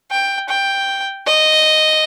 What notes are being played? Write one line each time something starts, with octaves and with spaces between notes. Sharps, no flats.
G5
G5
D#5